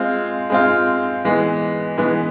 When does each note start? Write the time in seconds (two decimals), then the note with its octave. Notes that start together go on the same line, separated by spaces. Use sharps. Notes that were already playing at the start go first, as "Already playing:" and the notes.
Already playing: G#3 C4 F4
0.50 G#3 C4 F4
1.25 E3 G#3 B3
1.98 E3 G#3 B3